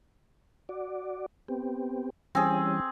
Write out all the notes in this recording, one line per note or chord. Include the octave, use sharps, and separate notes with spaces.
F#4 D5
B3 C4 G4
E3 G3 C4 C#4 G#4